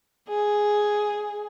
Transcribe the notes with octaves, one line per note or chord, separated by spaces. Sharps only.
G#4